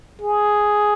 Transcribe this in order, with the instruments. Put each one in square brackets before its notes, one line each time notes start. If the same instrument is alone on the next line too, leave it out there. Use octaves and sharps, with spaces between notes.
[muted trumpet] G#4